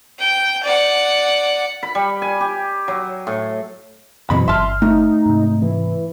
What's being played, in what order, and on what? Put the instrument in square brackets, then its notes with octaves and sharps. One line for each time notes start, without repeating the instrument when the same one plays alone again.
[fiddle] G5
D5 F#5
[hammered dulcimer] B5
G3
G#5
G4
F#3
A2
[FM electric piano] F#2 E3 F#3 [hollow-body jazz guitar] B2 C4 B5
[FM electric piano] G1 F6 [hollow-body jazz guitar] E5 A5 [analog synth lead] C6
[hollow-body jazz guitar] A3 [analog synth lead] D#4
[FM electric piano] G#2 C3
[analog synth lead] E3